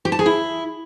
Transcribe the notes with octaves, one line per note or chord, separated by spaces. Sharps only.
G4
A5
G#4
E4